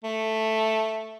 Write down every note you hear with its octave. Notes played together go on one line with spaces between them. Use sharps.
A3